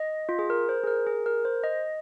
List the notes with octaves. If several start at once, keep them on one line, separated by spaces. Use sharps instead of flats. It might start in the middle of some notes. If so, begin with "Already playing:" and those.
Already playing: D#5
F4
G#4
A#4
C5
G#4
A#4
G#4
A#4
C5
D#5